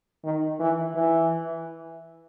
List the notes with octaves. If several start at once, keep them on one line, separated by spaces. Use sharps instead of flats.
D#3
E3
E3